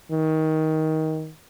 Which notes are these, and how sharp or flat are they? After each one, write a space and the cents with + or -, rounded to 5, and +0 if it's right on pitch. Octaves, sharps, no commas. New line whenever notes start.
D#3 +20